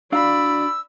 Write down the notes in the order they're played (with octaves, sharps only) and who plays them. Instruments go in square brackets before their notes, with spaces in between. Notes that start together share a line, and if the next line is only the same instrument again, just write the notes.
[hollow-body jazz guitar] D4 F#4 F5 [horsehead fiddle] D5 B5 [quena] E6